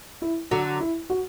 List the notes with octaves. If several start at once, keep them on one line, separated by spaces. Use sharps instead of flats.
E4
D3 F#3 F#4
E4
F#4